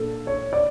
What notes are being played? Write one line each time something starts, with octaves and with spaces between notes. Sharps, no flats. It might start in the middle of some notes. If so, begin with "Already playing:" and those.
Already playing: A#2 D4 A4
C#5
D5